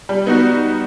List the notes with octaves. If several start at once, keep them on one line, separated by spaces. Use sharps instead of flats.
G3
B3 D#4 F#4